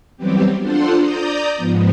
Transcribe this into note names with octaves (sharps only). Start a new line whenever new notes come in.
E3 F#3 G3 B3 C4 G4
D4 F4 A4 C5 F#5 C6
D5 A#5 D#6 G6
G#2 F3 B3